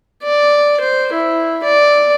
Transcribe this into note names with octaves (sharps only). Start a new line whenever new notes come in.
D5
C5
E4
D5